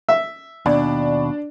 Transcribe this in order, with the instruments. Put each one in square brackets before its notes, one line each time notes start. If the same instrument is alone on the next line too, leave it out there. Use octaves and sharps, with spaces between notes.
[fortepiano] E5
[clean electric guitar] D#2 B2 [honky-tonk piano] D4